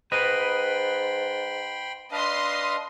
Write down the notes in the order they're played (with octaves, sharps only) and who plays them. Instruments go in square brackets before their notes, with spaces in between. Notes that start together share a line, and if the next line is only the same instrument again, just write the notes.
[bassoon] G#2 [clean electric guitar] B4 D#5 [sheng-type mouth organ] G5 B5 C6
[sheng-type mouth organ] D4 B4 F5 [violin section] D#5 C6